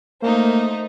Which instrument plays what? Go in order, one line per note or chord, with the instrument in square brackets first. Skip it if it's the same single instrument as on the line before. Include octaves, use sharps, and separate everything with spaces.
[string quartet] A3 D#4 C5 [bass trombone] A#3